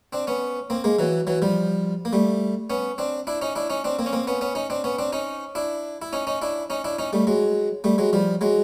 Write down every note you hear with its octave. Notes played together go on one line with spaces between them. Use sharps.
C4 D4
B3 C#4
A#3 C4
G#3 A#3
E3 F#3
E3 F#3
F3 G3
A#3
G3 A3
B3 C#4
C4 D4
D4 E4
C#4 D#4
D4 E4
C#4 D#4
C4 D4
A#3 C4
C#4
A#3 C4
B3 C#4
B3 C#4
C#4 D#4
C4 D4
B3 C#4
C4 D4
C#4 D#4
D4 E4
E4
C#4 D#4
C#4 D#4
D4 E4
C#4 D#4
D4 E4
C#4 D#4
G3 A3
F#3 G#3
G3 A3
F#3 G#3
F3 G3
F#3 G#3